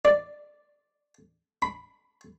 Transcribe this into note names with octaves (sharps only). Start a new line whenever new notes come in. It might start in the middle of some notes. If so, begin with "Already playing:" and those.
D5
B5